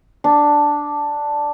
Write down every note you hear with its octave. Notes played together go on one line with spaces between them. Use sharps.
D4